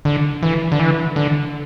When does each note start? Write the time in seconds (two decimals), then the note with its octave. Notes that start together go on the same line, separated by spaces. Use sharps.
0.05 D3
0.43 E3
0.72 D3
0.79 E3
1.16 D3